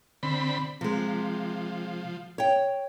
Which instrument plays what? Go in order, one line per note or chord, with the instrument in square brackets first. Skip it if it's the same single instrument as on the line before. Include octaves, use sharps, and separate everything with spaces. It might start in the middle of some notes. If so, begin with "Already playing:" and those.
[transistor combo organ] D3 C4 B5
[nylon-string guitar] C3 G#3 [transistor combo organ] F3
[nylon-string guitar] C#5 G5